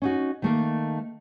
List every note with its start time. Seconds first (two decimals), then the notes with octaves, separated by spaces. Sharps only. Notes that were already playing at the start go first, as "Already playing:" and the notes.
0.02 C#4 D#4 F#4
0.42 D#3 A3 A#3